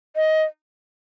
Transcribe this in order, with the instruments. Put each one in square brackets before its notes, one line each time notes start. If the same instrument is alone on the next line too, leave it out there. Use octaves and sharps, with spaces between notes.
[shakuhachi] D#5